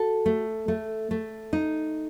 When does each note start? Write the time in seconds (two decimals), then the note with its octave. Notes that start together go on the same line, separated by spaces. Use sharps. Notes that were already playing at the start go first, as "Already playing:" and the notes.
Already playing: F#4 A4
0.26 A3
0.68 A3
1.11 A3
1.53 D#4